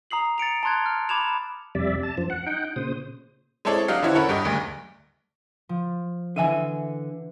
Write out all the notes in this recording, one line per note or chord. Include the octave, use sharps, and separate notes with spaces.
A#5 D#6 C7 F#7
A6 C#7 D7 F7
A5 A#5 C6 F#6 G#6
F6
B5 D6 G#6 E7 F7
F2 C3 G3 D5 E5
A5
F#2 F3
F#5
D#4 F#5 G5
A#2 C#3 C5 D#6
G#3 C4 E4 A4 C#5 D5
F#3 D4 G4 D#5 F5
D3 E3 C#4 E4 F#4 C5
C#4 A4 A#4 C#5 F#5 B5
G2 G4 D#5
F#1 D2 G2
F3
D3 E3 E5 G#5 D#7